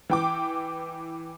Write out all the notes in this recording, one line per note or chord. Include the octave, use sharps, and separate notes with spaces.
E3 G5 D6